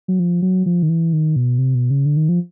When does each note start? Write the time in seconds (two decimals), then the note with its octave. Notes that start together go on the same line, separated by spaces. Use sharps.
0.08 F#3
0.19 F3
0.42 F#3
0.66 F3
0.83 D#3
0.89 E3
1.13 D#3
1.36 B2
1.58 C3
1.75 B2
1.90 C#3
2.06 D3
2.17 D#3
2.29 F3